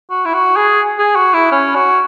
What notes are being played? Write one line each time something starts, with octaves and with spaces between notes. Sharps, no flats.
F#4
E4
F#4
G#4
G#4
F#4
E4
C#4
F#4